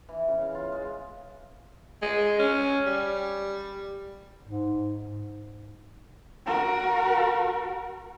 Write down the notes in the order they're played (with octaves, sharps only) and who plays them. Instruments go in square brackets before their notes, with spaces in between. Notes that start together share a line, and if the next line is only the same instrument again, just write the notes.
[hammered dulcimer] E3
C#3
F5
F4
G#3
[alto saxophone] G#3
C#4
G3
[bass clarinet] G#2
[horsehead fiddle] F#4 A#4